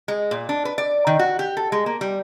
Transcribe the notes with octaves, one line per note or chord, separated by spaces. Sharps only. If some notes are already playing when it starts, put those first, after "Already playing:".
G#3
A#2
D4
B4
D5
D#3
F#4
G4
A4
G#3
A#3
G3